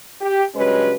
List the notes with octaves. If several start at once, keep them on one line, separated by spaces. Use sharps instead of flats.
G4
G2 C#3 F#3 G#3 C#4 B4